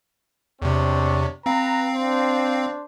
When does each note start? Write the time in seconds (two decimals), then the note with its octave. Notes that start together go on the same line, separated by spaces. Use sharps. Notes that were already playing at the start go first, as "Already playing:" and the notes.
0.62 E2 C3 C4 D4 C#5
1.46 C4 B4 F5 A#5
1.94 D4 C5